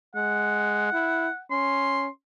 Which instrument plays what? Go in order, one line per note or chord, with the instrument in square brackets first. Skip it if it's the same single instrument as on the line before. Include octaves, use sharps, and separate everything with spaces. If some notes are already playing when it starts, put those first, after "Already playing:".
[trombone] G#3 [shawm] F#5
[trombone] E4
[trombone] C#4 [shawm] C6